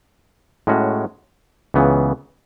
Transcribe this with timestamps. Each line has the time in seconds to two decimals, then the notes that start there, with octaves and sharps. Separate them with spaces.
0.67 A2 G#3 C#4 F#4
1.74 C#2 C#3 E3 B3